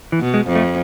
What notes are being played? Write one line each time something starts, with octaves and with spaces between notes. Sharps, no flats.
E3
B2
G#3
F2
A3